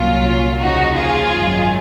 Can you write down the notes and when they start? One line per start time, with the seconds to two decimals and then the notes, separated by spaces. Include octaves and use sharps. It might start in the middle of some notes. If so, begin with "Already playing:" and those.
Already playing: C2 A#2 F#3 C#4 F4
0.59 D#2 C#3 F3 D#4 F#4
0.96 F4 G#4
1.34 G#1 F#2 D#3 F#3